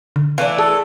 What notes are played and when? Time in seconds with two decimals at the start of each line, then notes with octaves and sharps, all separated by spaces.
0.16 D3
0.38 E3 A3 D4 F5
0.58 G#4 A4